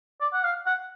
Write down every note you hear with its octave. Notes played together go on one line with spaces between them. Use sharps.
D5
F#5
F5
F#5